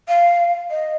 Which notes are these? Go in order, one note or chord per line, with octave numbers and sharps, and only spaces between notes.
F5
D#5